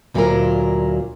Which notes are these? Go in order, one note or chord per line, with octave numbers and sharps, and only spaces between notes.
D2 A#2 F#3 E4 F4 A#4